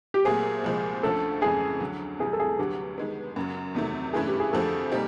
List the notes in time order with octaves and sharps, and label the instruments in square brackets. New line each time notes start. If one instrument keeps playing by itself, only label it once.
[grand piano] G4
[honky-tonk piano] A#2 F#3 A3 C4 [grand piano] G#4
[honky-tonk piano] C2 A#2 F3 G#3
[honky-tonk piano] D2 D3 F3 A3 C#4 [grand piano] A4
[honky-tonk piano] F2 C#3 E3 G#3 C#4 [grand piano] G#4
[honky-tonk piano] D2 D3 F#3
[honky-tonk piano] C3 E3 G3 [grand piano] G#4
[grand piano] A4
G#4
[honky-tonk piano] D2 D3 F#3 B3 [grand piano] G4
[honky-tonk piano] D#3 G#3 B3
F#2 C#3 F#3
E2 C3 D#3 F#3 A3
[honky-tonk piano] G2 E3 A3 C#4 [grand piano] G#4
[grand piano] G4
G#4
[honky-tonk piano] F2 D3 F3 A3 [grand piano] A4
[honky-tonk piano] A#2 G3 C4 D#4 G4